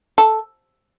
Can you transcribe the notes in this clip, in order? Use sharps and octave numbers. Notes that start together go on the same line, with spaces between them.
A4